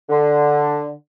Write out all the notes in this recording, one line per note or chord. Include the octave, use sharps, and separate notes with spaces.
D3